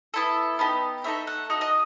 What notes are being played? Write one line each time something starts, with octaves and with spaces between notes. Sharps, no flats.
B3 E4 A4
B3 D#4 G4
A3 D#4 A4 E5
F#5
D#4 F#4 A4
D#5